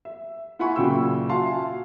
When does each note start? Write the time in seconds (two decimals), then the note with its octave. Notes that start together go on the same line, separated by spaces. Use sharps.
0.05 E5
0.59 E4 F4 F#5 G#5 B5 C#6
0.76 A#2 C#3 F#3 G5 E6
1.29 F#4 E5 F5 G#5 A5 C6